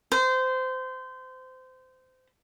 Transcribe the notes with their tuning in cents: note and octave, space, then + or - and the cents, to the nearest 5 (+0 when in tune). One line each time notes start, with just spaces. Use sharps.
C5 -25